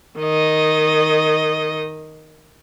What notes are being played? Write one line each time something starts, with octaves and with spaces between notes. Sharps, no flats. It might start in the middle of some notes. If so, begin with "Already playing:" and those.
D#3 D#5